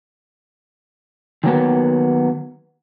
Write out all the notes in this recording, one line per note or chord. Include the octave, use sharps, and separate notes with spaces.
D#3 F#3 A#3 B3